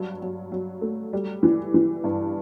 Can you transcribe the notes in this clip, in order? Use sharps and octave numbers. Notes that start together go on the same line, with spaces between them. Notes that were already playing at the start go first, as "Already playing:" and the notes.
Already playing: G2 F#3
F#3
F#3
A3
G3
E3
E3
G2